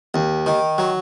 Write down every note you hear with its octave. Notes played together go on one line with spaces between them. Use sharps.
D#2
D#3
F#3